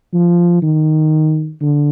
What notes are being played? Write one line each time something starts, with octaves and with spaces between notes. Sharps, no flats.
F3
D#3
D3